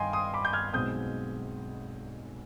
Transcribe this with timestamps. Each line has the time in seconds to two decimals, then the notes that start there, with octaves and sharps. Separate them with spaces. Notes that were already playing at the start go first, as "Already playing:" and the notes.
Already playing: G2 D#3 G3 D#5 F5 G5 G#5 C6
0.13 C6 D#6
0.34 B5 D6
0.45 G6
0.53 F6 G#6
0.73 B1 B2 G#3 C4 D#6 G6